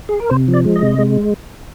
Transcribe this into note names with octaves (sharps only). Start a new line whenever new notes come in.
G#4
A#4
C3 C5
F3
D5
G#3
D#5
C3
G#3